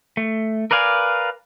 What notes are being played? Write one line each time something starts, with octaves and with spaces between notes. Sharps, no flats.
A3
A#4 B4 D5 F5 G#5